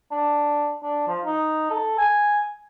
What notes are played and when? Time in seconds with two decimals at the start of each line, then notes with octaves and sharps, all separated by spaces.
0.12 D4
0.83 D4
1.08 F3
1.25 D#4
1.70 A4
1.98 G#5